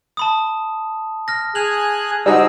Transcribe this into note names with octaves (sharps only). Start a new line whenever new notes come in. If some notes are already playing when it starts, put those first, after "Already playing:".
A5 B5 D#6
F6 A#6
G#4 G#5 F#6 F7 F#7
G3 C4 D#4 F#4 G#4 E6